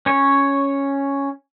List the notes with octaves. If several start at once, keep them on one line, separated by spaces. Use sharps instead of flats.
C#4 C#5